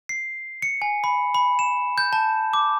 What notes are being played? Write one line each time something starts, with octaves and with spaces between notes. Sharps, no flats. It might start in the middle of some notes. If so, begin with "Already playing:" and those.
C7
C#7
G#5
B5
B5
E7
G6
A5
D6